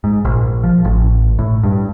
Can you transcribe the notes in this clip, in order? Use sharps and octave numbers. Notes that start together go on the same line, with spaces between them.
G#2
A#1
F3
A1
A2
G2